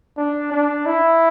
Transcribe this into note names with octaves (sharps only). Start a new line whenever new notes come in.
D4
D4
E4